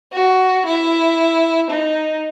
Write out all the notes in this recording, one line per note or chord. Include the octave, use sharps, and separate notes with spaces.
F#4
E4
D#4